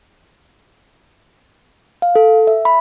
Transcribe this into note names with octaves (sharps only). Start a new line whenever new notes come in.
F5
A4
E5
B5